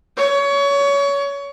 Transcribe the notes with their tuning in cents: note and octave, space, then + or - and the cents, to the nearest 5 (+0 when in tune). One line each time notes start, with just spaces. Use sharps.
C#5 +25